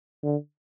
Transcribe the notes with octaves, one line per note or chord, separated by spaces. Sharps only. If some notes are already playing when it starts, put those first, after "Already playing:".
D3